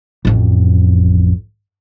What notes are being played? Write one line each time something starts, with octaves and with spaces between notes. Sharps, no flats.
A1 F2